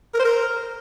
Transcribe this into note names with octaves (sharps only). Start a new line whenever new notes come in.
A#4
C5
A#4